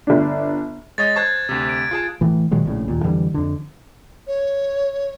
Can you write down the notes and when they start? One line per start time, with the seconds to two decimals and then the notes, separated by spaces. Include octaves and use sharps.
0.07 G1 D4
0.98 G#3 C#5 D#5 A6
1.16 C5 A5 C#6 F#6 G#6 A6
1.49 D2 C3
1.69 D7
1.91 F4 G#4 A5
2.21 A2 E3
2.51 A#2 D#3 F#3 G#3
2.65 A#1 A2 C#3
2.88 D#2 A#2
3.04 F2 D3 E3 G3
3.34 F2 D3
4.27 C#5